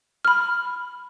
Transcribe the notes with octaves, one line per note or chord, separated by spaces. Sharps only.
B5 F6